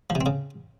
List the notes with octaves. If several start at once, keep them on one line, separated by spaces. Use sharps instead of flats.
F3
C3
C4
C#3